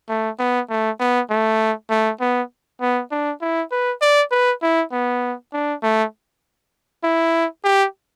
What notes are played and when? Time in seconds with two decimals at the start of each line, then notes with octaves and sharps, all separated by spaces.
0.09 A3
0.39 B3
0.70 A3
0.99 B3
1.30 A3
1.90 A3
2.20 B3
2.81 B3
3.11 D4
3.41 E4
3.71 B4
4.01 D5
4.31 B4
4.62 E4
4.92 B3
5.53 D4
5.83 A3
7.03 E4
7.64 G4